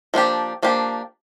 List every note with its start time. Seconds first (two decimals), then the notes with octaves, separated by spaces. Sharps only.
0.14 F3 A#3 D4 G4
0.62 F3 A#3 D4 G4